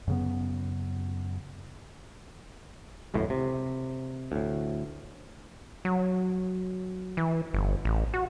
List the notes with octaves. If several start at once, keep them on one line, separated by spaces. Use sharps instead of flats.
F#2 C#3 B3
G#1 C#2 F#2 A2
C3
D2 A2
F#3
E3
G1
A1
F#4